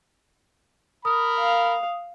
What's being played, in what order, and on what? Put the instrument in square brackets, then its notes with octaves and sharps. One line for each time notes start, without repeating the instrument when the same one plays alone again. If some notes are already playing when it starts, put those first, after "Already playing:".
[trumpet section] A#4 B5 [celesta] D#6
[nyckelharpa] F5